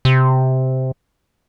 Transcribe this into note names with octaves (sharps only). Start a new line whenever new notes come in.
C3